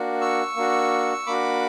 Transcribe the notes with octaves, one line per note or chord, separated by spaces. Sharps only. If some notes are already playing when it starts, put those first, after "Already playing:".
Already playing: A#3 D4 F#4
C#6 E6
A#3 D4 F#4
A#3 D4 F#4 B5 D6